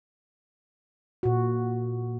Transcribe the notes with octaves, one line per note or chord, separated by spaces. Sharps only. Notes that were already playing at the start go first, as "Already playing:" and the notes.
A#2 F#4